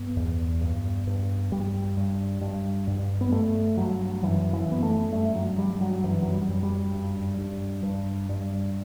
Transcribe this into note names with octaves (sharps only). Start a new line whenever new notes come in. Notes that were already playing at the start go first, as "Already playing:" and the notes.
Already playing: G2 B3
E2
G2
G2
G2 G3
G2
G2
G2
B3
G2 A3
G2 F#3
F#2 E3
E3
F#2 B3
A3
G2 A3
F#3
G2 G3
F#3
F#2 E3
F#3
G3
F#2
G3
G2
G2
G2
G2